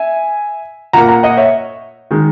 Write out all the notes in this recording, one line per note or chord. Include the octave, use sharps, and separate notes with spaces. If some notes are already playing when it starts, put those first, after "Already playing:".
Already playing: E5 G#5
A#2 A#3 F#5 A#5
F#5 A#5
D#5 F#5
C#5 E5
D#3 G#3